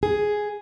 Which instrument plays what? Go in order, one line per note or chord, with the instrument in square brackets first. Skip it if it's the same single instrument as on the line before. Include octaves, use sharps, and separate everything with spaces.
[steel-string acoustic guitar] G#4